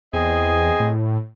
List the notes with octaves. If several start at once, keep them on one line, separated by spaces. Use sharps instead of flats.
E2 C4 G#4 D#5
A2